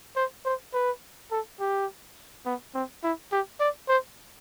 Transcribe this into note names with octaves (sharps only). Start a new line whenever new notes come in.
C5
C5
B4
A4
G4
B3
C4
E4
G4
D5
C5